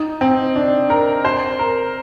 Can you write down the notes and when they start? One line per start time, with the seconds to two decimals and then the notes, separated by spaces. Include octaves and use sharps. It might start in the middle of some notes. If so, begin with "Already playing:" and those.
Already playing: D#4
0.21 C4
0.56 D4
0.90 A#4
1.25 C5
1.59 A#4